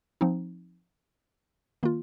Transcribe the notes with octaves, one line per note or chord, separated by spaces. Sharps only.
F3 C4 D#4
D#3 A#3 F4